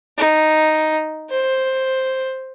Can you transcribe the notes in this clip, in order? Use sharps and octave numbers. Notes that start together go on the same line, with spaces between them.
D#4
C5